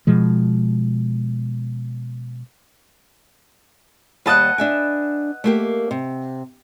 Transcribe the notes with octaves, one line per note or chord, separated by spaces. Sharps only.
B2 F3 G#3
D#2 G3 B4 D#5 F#5 A5
D4 E5 G#5
A3 A#3 G4
C3